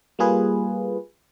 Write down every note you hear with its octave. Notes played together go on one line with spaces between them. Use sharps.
G3 A#3 F4 G#4 B4